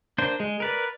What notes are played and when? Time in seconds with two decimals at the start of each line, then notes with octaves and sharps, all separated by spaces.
0.18 A#3 D4 C5
0.40 G#3
0.60 A#4 B4 D5